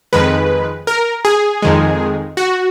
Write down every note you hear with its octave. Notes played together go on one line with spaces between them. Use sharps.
F2 D#3 G#3 B4
A#4
G#4
F2 D#3 G#3
F#4